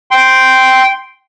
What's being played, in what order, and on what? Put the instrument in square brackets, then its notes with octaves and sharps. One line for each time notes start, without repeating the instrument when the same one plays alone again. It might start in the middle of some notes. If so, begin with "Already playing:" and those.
[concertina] G5 C6